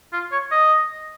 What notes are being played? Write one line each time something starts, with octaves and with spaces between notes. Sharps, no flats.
F4
C#5
D#5